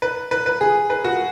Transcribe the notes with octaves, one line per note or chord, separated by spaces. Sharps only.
B4
B4
B4
G#4
B4
F#4